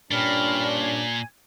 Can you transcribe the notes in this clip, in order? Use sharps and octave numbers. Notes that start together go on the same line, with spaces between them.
G2 A#2 C#4 D4 G5 B5 F6
G#5 G#6